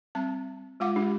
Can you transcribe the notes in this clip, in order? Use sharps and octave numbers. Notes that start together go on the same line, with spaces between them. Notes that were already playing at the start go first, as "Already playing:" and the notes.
G3 C4 A5
G#3 F4 F5 F#5 D6
G#3 D4 G4